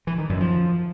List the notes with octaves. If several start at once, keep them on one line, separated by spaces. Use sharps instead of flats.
E3
D#3
F#2
F3